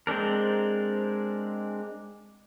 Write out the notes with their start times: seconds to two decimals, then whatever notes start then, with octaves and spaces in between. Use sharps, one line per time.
0.07 G#3 C4 D4 A#4